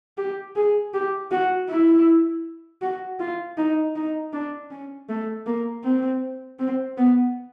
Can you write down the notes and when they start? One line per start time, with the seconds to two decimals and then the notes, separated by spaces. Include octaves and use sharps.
0.18 G4
0.56 G#4
0.94 G4
1.31 F#4
1.69 E4
2.82 F#4
3.20 F4
3.58 D#4
3.96 D#4
4.33 D4
4.71 C#4
5.09 A3
5.46 A#3
5.84 C4
6.59 C4
6.98 B3